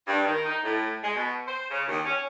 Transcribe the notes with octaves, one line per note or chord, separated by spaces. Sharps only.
G2
D#3
D#4
A2
G#3
B2
C5
C#3
D#2
C#4